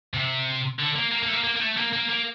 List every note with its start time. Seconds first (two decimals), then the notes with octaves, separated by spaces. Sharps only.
0.14 C3
0.79 D3
0.96 A#3
1.11 A#3
1.23 A#3
1.28 A3
1.33 A#3
1.44 A#3
1.56 A#3
1.61 A3
1.77 A#3
1.93 A#3
2.10 A#3